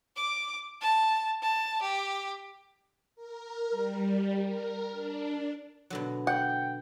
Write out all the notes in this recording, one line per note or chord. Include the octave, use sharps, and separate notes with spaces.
D6
A5
A5
G4
A#4
G3
A#4
D4
B2 D3 F#3
F#5 G5